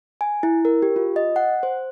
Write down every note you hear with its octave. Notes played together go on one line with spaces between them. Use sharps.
G#5
E4
A#4
G4
F4
D#5
F#5
C5